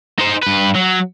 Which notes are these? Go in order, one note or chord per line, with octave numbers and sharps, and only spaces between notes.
D#4 C5
G2 B4
F#3